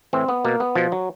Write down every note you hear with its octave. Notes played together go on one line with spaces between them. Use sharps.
A2 E3 C4
B3
B2 A#3
B3
B2 F3
F#3